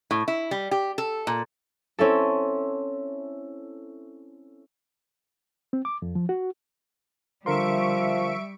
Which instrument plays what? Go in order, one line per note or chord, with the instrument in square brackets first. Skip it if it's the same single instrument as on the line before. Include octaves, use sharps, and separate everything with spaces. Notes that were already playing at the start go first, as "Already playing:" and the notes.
[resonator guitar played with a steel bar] A2
E4
G3
G4
A4
A#2
[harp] C4 C#4 E4 A4
[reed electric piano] C4
D6
F2
F3
F#4
[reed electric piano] D3 A#4 C6 [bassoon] F3 [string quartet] G3 [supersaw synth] E5 C#6 D7